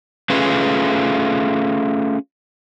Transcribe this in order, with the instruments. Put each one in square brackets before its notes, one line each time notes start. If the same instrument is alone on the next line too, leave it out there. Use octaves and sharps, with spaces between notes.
[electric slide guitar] A3 C#4 F4 G#4 B4